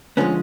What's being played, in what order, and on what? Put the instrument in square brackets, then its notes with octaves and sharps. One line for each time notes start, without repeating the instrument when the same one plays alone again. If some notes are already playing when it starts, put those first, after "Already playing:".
[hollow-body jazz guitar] D3 F3 G#3 B3 C#4